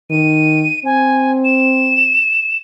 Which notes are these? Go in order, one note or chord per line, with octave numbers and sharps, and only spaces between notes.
D#3 D#7
C4 G#5
E7